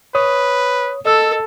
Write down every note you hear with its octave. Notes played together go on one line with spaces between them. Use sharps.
B4 C#5 D#6
A4 D#5 E6